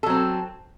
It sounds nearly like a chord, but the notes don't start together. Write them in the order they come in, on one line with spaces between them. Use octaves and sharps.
A4 F#3 C4